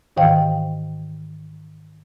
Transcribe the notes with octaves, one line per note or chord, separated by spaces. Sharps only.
G#2 D#3 E3 C5 F5 G5